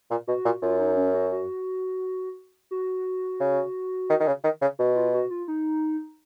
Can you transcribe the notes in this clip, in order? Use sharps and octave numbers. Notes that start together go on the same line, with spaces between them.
A#2
B2 F#4
A#2
F#2 F4
D#4
C#4
F#4
F#4
F#4
C#3
D#3
D#3
C#3
D#3
C#3
B2 F#4
F4
F#4
F4
D#4